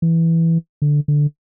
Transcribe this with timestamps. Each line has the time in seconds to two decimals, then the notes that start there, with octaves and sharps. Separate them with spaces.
0.02 E3
0.82 D3
1.08 D3